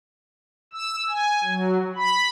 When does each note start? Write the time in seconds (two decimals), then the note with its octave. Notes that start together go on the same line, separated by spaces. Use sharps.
0.73 E6
1.10 G#5
1.44 F#3
1.96 B5